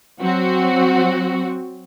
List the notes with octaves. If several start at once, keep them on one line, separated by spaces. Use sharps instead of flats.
F#3 C4 F#4